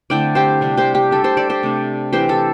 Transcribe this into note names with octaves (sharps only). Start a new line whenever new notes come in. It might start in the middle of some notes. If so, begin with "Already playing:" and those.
D3 A3 C4 E4 D5 G5
G4 C5
C3 G3 D4
G4 C5
G4
G3 D4 A4
G4 C5
A4 D5
G4 C5
C3 A3 D4
E3 C4 E4 G4 C5
A4